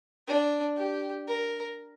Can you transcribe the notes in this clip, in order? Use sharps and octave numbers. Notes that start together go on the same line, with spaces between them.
D4
G4
A#4